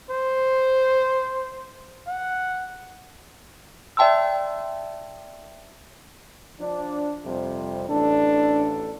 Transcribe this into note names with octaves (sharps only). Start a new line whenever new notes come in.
C5
F#5
D5 E5 G5 A5 C6 E6
F3 D4
F2 C3 G3
A1 D4 A4